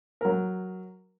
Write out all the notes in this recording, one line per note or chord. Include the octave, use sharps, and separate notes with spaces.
F#3 A#4